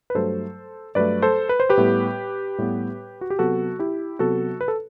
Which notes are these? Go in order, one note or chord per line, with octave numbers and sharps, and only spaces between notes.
B4
G2 F#3 A3 A4 C5
G2 F#3 A3 B4 D5
A4 C5
B4
C5
G4 B4
A2 G3 B3
A2 G3 B3
F#4
G4
C3 F#3 B3 F#4 A4
E4 G4
C3 F#3 B3 F#4 A4
B4
A4